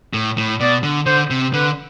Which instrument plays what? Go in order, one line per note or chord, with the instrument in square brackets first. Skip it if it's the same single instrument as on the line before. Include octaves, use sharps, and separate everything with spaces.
[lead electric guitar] A2
A2
[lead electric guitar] B2 [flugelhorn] D5
[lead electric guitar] D3
[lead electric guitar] D3 [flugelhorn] C5
[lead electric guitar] C3
[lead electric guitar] D3 [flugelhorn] B4